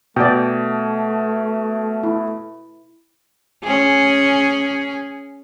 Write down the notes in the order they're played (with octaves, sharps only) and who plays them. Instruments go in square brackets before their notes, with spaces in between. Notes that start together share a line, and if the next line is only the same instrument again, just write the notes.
[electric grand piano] B2 [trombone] A3 [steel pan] D5 E5 G5
[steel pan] E4
[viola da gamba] C#4 G#4